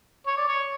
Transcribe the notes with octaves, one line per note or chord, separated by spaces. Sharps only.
C#5
D5
C#5